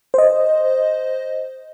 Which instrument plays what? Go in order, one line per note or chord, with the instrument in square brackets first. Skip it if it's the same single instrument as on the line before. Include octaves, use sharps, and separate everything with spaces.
[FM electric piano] C5 D#5